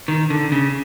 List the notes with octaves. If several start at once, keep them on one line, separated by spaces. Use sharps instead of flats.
D#3
D3
C#3